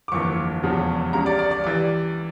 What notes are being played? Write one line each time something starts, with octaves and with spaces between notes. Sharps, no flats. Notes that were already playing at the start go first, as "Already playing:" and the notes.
D6
G1 F2 E3 A#3 C#6
E1 E2 C#3 F3 C#4
C#2 C#3 G3 A#5
D5
D5
D5
E3 G3 D5